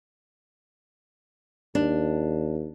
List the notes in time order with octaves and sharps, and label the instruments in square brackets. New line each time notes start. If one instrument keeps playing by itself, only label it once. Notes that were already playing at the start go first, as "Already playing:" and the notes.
[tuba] D#2 [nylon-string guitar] D4